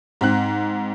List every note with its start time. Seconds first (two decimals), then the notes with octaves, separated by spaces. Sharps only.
0.21 G#2 C4 F#6